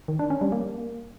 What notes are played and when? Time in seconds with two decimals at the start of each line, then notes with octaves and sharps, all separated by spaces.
0.08 D#3
0.19 D4
0.30 C#4
0.41 G3
0.52 A#3